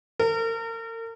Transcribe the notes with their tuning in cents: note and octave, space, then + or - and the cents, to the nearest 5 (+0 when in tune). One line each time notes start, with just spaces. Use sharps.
A#4 -40